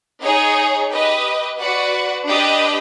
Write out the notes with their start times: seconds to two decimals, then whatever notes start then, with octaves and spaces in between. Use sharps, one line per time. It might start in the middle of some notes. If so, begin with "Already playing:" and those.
0.23 D#4 G#4 C#5
0.90 G4 B4 D#5
1.59 F#4 B4 D5 F#5
2.27 D4 G4 B4 D#5